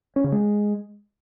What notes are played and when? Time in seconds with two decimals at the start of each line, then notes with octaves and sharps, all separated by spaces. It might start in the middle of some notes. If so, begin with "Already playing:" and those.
0.16 C#4
0.24 C#3
0.32 G#3